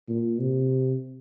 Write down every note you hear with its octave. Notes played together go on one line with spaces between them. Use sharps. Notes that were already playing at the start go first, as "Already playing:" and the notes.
A#2
C3